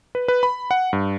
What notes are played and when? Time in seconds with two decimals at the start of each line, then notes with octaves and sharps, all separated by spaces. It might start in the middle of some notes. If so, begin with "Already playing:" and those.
0.15 B4
0.28 B4
0.43 B5
0.71 F#5
0.93 G2